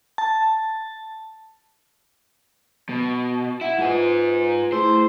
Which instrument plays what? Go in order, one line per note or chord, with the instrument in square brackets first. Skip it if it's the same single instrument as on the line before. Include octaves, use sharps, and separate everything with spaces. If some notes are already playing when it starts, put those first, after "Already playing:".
[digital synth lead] A5
[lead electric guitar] B2
[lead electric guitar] E4 [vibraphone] F#5
[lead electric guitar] G#2 G#4 [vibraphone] F4 B4
[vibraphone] A3 E4 G#4 [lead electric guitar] C5